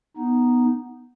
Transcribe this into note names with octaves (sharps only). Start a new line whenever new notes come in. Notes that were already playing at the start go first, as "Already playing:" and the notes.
B3 D#4